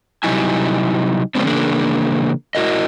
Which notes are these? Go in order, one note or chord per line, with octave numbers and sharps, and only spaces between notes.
C3 F#3 G3 D#4 E4 G#5
C#3 F3 G#3 B3 C4 D4
C#3 E3 A#3 D4 G#4 A#4
E4 F#4 A#4 D#5